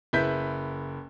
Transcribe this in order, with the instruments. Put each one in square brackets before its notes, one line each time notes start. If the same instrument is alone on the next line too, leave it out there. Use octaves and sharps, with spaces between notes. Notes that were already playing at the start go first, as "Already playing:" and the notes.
[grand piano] F#1 E4 B4 G6 B6